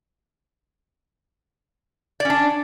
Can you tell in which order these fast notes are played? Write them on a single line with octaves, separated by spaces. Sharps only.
D5 C#4 D4